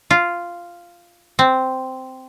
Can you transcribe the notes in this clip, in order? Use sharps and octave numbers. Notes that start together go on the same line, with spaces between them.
F4
C4